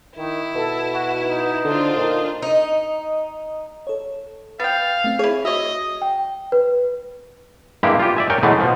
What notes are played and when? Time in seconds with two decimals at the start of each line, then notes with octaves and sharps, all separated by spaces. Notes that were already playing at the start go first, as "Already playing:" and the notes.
0.16 D#3 E4
0.55 B2 A4
0.92 F#4
1.22 D#4
1.65 D3 D4 F4 C5
1.97 A#2 D#4
2.42 D#4
3.87 A4 C#5
4.60 B3 F5 G5 A6
5.04 A3 C4
5.19 E4 G#4 C#5
5.45 F#4 C#5 D#5 E5
6.02 G5
6.52 B4
7.83 G2 G#3 A#3 E4 G4
7.99 F4 G4
8.16 D5 E5 G#5
8.30 A#4 C#5 G5 G#5 A#5
8.43 B2 E3 F#3 G#3 A3
8.60 B2 F3